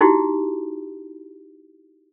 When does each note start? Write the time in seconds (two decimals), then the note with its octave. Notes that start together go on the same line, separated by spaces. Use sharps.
0.01 D#4 E4 F#4 G4